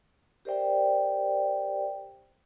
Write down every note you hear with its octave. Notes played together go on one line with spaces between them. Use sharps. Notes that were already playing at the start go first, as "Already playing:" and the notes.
G4 A#4 C5 D5 E5 G5